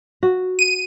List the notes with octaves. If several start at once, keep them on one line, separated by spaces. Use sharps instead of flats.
F#4
D#7